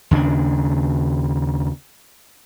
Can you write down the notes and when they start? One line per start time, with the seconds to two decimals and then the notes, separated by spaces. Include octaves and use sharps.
0.11 D#2 C#3 B3 D4